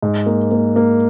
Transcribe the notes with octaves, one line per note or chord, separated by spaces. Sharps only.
G#2
A#3
A#3
A#3